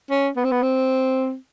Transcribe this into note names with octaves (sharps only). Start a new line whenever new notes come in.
C#4
B3
C4
B3
C4